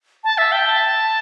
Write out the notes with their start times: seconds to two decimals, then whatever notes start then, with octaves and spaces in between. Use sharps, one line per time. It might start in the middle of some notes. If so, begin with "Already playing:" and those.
0.24 A5
0.38 E5
0.52 G5
0.65 A5